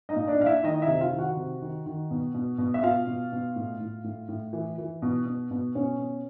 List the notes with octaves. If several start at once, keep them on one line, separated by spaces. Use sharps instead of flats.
D#4 D#5
A#2
D4 D5
A#2 F5
E4 E5
D#3 D#4 D#5
E4 E5
C3
F4 F5
D#3
F#4 F#5
C3
D#3
D#3
B2
B2
B2
E5
B2 F4 F5
B2
B2
A2
A2
A2
A2
E3
E3
B2
B2
B2
B2 C#4 C#5
B2